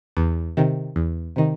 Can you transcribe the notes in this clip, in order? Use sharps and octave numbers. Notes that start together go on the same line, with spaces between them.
E2
C3 D#3
E2
C3 D#3